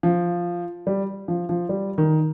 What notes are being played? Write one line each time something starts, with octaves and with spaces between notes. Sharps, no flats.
F3
G3
F3
F3
G3
D#3